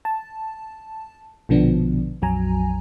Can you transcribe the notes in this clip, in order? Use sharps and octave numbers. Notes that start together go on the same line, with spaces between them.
A5
A#1 B2 D3 F3 B3 D4
A#1 F2 F#3 G#5 A#5